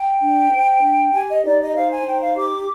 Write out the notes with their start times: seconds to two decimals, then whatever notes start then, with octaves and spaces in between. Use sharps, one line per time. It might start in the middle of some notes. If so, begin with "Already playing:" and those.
Already playing: G5
0.22 D4
0.51 C5
0.82 D4
1.13 G4 G#5
1.28 D#5
1.44 D#4 D5
1.59 D#5
1.74 C5 F5
1.90 G#5
2.05 D#4 G5
2.20 F5
2.35 G4 D6